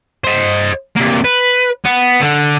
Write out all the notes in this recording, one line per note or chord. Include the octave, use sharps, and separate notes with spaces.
C5 D#5
C3 A#3
B4
B3
D3